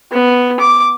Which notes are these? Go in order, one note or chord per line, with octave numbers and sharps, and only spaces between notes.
B3
D6